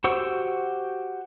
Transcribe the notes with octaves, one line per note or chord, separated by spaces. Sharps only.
F#4 G4 C5 C#6 E6